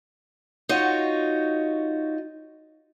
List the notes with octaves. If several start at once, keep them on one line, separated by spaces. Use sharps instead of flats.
D#4 F4 F#4 C#5